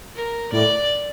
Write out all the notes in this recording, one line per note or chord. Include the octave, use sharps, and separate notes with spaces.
A#4
A2 D5